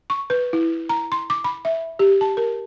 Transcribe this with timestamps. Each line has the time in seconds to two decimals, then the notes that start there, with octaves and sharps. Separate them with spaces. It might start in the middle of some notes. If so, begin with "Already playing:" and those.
0.10 C#6
0.30 B4
0.53 E4
0.89 A#5
1.12 C6
1.30 D6
1.44 B5
1.65 E5
1.99 G4
2.21 A5
2.37 A#4